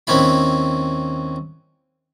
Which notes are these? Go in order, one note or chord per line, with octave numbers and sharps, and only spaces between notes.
D#2 C4 C#4 E4 B5